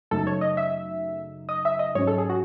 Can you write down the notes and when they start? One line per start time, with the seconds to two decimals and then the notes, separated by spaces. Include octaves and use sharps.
0.11 F#2 C#3 F#3 A3 D#4 A4
0.27 C#5
0.41 D#5
0.57 E5
1.49 D#5
1.65 E5
1.79 D#5
1.95 G#2 F#3 C#4 C#5
2.07 A4
2.18 G#4
2.30 F#4